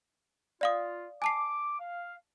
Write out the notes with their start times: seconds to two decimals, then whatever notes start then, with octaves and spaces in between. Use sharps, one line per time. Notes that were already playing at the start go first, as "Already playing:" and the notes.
0.61 F4 D5 F5 D#6
1.22 G#5 A5 D6 C7
1.80 F5